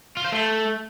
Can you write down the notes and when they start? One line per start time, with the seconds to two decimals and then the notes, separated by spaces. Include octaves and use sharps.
0.17 F4
0.25 C5
0.32 A3